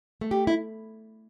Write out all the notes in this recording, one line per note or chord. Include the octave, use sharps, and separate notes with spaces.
A3
G4
E4